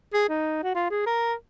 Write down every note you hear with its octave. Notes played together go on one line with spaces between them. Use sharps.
G#4
D#4
F#4
F4
G#4
A#4